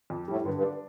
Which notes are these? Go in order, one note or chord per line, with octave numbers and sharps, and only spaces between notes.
F2
A2 G3
G2
D3
G2
D4